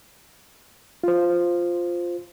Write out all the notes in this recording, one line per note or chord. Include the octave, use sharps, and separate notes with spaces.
F4 C5